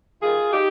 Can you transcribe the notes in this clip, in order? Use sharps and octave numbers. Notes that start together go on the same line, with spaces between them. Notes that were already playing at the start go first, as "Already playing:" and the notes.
D#3 G3 F4 G#4
D#4 G4